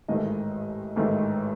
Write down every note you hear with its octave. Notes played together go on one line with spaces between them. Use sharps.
A1 G#2 D#3 A3 D#5
A1 G#2 D#3 A3